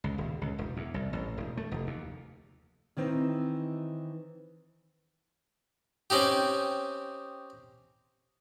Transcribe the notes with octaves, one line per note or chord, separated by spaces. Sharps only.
C#2
D#1
C#2
E1
E2
C2
A1
E1
A3
F1
D#2
D#3 E3 C4 D#4
C4 C#4 D#4 G4